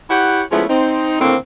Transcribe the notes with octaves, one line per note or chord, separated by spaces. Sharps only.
E4 G4 C#5 F#5
F3 G#3 A3 B3 C#4 E4
C4 D#4
A2 D3 D#3 A#3 C4